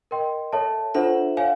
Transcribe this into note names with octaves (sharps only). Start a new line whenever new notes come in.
A#4 D#5 G5 C6
A4 C#5 E5 A5
D4 F4 A4 C5 E5 F#5
C#5 F5 G#5